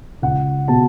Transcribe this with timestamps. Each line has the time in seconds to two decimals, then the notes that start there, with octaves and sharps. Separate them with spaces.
0.22 C#2 F#5
0.68 B2 B3 A5